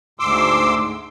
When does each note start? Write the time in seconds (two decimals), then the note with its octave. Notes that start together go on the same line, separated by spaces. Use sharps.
0.20 D2 G#2 C6 D6 E6